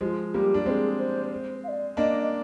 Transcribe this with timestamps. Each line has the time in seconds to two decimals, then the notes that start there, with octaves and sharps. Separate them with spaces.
0.01 F3 G#3 G4
0.05 F4
0.33 G3 A#3 G4
0.54 D4
0.66 G#3 C4 C5
0.70 G#4
0.99 C5
1.32 C5
1.64 F5
1.68 D5
1.97 A#3 D4 D#5